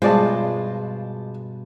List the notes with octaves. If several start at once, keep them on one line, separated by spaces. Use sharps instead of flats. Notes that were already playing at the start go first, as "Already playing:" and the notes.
G2 B2 G#3 F4 C5 D5 A5